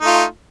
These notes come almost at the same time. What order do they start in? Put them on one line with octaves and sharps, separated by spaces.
D#4 A3 F4